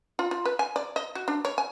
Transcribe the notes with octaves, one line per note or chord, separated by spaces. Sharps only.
F4
F4
B4
G#5
D5
D#5
F#4
D4
C#5
G#5